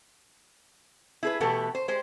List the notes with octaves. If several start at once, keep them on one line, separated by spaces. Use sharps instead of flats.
E4 G#4 B4
B2 E3 A3 B3 G4 A4
C5
G#3 G4 C5